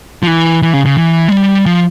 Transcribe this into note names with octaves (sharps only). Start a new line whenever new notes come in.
F3
E3
E3
C#3
C#3
E3
G#3
G3
F3